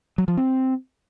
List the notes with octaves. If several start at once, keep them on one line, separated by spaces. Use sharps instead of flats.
F#3
F3
C4